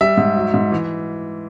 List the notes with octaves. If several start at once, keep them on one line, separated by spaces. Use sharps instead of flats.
G3 E5
G#2
F#3
G#2
E3